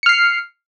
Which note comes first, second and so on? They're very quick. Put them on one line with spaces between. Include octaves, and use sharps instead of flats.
C#7 F6 C7